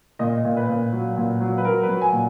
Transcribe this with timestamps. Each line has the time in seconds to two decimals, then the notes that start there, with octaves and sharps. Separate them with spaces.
0.19 A#2 D#5
0.45 A#2
0.57 B4
0.68 A#2
0.92 F#3
1.17 A#2
1.41 F#3
1.58 B4
1.64 F#3 A#4
1.83 B4
1.88 F#3
2.01 G#5
2.12 A#2